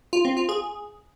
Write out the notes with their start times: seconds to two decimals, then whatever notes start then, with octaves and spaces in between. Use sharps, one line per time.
0.13 F4
0.25 C4
0.37 F4
0.49 G#4